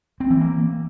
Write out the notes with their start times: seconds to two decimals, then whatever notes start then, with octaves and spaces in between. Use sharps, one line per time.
0.20 C4
0.30 E3
0.40 A#3